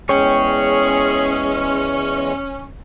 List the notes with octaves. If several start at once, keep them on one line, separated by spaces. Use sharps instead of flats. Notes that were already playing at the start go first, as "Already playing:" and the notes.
E2 G#3 C#4 G#4 C#5 G5 C#6